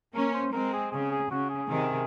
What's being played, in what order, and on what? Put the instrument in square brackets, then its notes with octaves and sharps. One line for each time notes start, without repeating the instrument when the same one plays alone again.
[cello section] A#3 C#4 [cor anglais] A#4
[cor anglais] C5
[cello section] G#3 C4 [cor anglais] A#4
[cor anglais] G#4
[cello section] C#3 [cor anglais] G#4
[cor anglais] G#4
[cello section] C#3 [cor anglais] F#4
[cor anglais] G#4
[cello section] C3 D#3